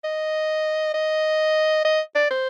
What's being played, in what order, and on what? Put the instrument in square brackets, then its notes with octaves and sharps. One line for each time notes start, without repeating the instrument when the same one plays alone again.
[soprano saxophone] D#5
D#5
D#5
D5
C5